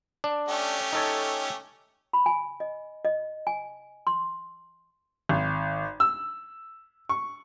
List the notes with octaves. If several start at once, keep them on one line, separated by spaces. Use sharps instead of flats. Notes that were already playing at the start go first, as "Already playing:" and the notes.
D4
A3 C#4 G4
D#4 A4 C#5
B5
G#5
D#5
D#5
G#5
C6
G#1
E6
C#6